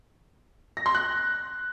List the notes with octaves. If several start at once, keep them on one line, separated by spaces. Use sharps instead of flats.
A#6
C6
F#6